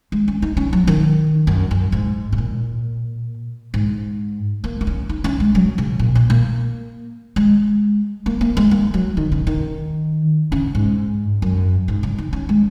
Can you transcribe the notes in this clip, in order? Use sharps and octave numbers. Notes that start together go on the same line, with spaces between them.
G#3
C#4
D#4
C#4
F#3
D#3
F#2
F#2
G#2
C#3
A#2
G#2
A#3
A#3
C#4
D#4
C#4
G#3
F#3
C#3
A#2
A#2
A#3
G#3
A#3
A#3
G#3
A#3
F#3
D#3
C#3
D#3
C#3
G#2
F#2
G#2
C#3
D#4
C#4
G#3